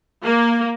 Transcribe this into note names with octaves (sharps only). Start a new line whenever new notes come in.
A#3